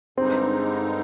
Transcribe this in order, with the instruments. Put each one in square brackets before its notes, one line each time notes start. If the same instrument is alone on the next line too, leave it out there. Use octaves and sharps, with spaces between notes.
[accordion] G2 D3 G#3 D#4 [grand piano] C4